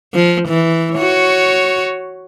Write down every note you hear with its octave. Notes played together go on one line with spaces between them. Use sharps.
F3
E3
F#4 C#5